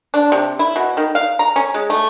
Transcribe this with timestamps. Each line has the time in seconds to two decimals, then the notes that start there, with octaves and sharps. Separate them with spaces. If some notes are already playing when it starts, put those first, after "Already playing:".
0.14 D4
0.32 C3
0.59 E4
0.76 B2
0.97 D#3
1.15 F5
1.39 A#5
1.56 C#4
1.74 G#3
1.90 A3